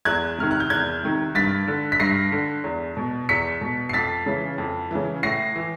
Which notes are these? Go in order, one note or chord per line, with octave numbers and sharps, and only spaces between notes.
E2 F#6 G#6
C3 D#3 F6
F#6
G6
E2 F#6 G#6
C3 D#3
G2 A6 B6
D3
B6
G2 A#6 C7
D3
E2
B2
E2 B6 C#7
B2
C7
F2 A6 B6
C#3 E3
F2
C#3 E3
A2 A#6 C7
E3